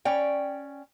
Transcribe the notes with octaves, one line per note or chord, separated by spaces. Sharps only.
C#4 D5 G5